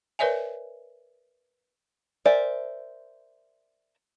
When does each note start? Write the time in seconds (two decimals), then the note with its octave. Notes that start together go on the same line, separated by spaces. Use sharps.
0.19 A#4 B4 C#5 D5 E5 G#5
2.25 A#4 C5 D5 E5 G#5